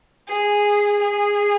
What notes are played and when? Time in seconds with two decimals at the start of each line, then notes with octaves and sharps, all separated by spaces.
0.28 G#4
0.99 G#4